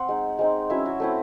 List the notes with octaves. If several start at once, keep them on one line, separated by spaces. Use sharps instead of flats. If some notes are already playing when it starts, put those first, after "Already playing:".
Already playing: C4 F#5 C6
G#3 D#4
G#3 C4 D#4
F#3 C#4 E4 E5
F#4
A3 C4 E4